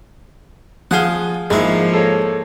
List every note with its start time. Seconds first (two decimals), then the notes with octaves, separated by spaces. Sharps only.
0.91 F3 G#4 F5 F#5 G7
1.50 G#2 F3 G#3 A#3 E4
1.93 A4 C#5